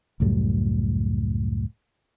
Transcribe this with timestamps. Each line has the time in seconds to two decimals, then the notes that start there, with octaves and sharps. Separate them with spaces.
0.20 C#2 F#2 A2 G3